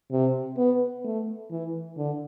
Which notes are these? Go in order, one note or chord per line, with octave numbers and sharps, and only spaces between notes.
C3
B3
A3
E3
D3